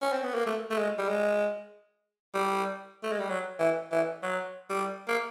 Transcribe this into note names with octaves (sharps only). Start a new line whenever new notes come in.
C#4
C4
B3
A#3
A3
A3
G#3
G3
G#3
G3
A3
G#3
G3
F#3
E3
E3
F#3
G3
A#3